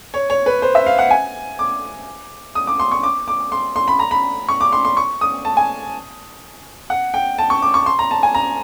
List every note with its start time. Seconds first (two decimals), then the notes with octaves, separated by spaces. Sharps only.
0.14 C#5
0.30 C#5
0.46 B4
0.62 C5
0.75 E5
0.86 F5
0.99 F#5
1.11 G#5
1.59 D6
2.55 D#6
2.67 D6
2.80 C6
2.92 C#6
3.03 D6
3.28 D6
3.52 C6
3.76 C6
3.88 B5
3.99 A#5
4.11 B5
4.49 C#6
4.61 D6
4.73 C6
4.85 C6
4.97 C#6
5.21 D#6
5.45 A5
5.57 G#5
6.90 F#5
7.14 G5
7.38 A5
7.50 C#6
7.62 D6
7.74 C#6
7.86 C6
7.99 A#5
8.11 A5
8.23 G#5
8.35 A#5